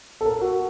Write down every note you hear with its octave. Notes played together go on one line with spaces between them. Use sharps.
A4
A#4
F#4